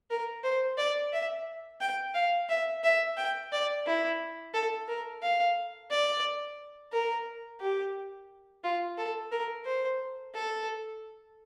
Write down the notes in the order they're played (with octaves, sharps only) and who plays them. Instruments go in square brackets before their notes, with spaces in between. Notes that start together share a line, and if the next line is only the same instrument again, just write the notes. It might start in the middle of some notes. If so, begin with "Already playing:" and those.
[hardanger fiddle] A#4
C5
D5
E5
G5
F5
E5
E5
G5
D5
E4
A4
A#4
F5
D5
A#4
G4
F4
A4
A#4
C5
A4